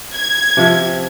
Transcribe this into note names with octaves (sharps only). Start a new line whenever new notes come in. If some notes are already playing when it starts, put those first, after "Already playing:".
G#6
C3 F3